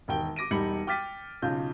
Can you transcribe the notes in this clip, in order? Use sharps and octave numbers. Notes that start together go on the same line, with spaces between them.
E1 D#3 G5 G7
D6 A#6 D7 D#7
E1 G3 D#4 B5 C#7 F#7
G5 D6 F6 A6 B6 D#7
B1 C#3 F4 G6